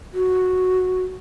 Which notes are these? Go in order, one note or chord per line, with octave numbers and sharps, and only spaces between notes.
F#4